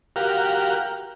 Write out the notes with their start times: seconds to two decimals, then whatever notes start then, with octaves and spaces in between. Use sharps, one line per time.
0.16 F#4 G4 A#4 F5